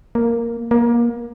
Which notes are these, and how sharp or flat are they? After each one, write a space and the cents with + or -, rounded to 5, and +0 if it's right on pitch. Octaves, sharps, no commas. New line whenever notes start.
A#3 +0
A#3 +25